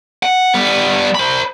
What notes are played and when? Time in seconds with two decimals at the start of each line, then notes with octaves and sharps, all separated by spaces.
0.23 F#5
0.54 G3 B3
1.15 C5 B5